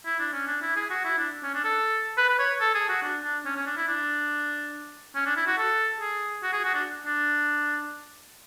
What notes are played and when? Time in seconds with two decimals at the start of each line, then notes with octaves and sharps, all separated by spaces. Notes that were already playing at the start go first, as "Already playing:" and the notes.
0.06 E4
0.20 D4
0.33 C#4
0.47 D4
0.62 E4
0.76 G#4
0.90 F#4
1.05 E4
1.18 D4
1.44 C#4
1.54 D4
1.65 A4
2.18 B4
2.30 B4
2.39 C#5
2.61 A4
2.75 G#4
2.89 F#4
3.03 D4
3.24 D4
3.45 C#4
3.56 C#4
3.66 D4
3.77 E4
3.88 D4
5.15 C#4
5.26 D4
5.37 E4
5.47 F#4
5.58 A4
6.00 G#4
6.43 F#4
6.53 G#4
6.64 F#4
6.74 D4
7.06 D4